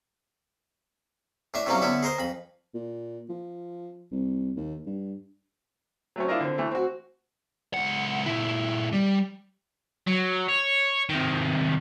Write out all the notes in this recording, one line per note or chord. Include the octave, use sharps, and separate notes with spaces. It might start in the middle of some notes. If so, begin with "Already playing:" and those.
A2 D4 E5
A2 C3 F#3 G3 A#3 C#4
D3 B3 C#4 E4
G#4 A#4 C5 D#5
F2 B5
A#2
F3
C2
D#2
G2
F#3 A3 C4 C#4
D4 E4 F4 A#4 D#5
D3 C4
E3 A3
C4 F#4
C#2 F#5
A#2 E4
G3
F#3
C#5
C3 D#3